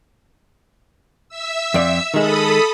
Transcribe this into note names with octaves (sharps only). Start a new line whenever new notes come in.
E5 E6
F2 D5
D#3 G#3 A4 B5 D#6